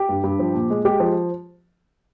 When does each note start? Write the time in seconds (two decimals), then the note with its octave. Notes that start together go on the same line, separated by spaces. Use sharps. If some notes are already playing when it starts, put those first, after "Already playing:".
Already playing: G4
0.09 G2
0.24 G2
0.39 F3
0.54 A#2
0.70 G#3
0.85 G#3 G4
1.00 F3